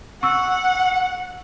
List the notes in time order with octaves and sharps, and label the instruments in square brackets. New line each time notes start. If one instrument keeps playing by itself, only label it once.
[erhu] F#5 [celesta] C#6 E6